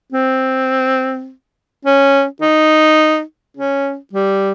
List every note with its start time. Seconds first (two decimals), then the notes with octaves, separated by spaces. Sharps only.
0.12 C4
1.85 C#4
2.41 D#4
3.57 C#4
4.13 G3